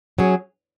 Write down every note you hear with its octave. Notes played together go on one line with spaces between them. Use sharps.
F#3 C#4 G#4